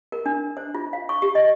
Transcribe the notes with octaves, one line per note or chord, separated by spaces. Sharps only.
A#4
D4
C5
F4
F5
C#6
G4
D#5